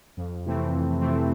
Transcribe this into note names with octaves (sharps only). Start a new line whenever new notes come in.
F2
C3 E3 A3 C4
F2
C3 E3 A3 C4